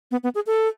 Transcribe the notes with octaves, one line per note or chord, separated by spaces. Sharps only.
B3
B3
G#4
A4